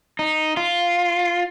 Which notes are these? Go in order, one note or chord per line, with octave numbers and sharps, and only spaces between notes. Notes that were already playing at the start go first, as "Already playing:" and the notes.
D#4
F4